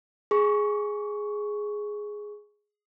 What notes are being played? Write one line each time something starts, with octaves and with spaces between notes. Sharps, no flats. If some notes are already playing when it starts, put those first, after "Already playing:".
G#4 C#6